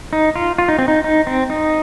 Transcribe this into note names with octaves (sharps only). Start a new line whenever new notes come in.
D#4
F4
F4
D#4
C4
D#4
D#4
C4
D#4